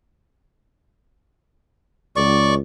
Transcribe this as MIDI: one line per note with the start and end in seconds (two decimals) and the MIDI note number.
2.16 2.58 37
2.16 2.54 74
2.16 2.54 85